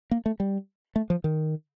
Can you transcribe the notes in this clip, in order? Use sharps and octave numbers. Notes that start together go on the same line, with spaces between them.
A#3
A3
G3
A3
F3
D#3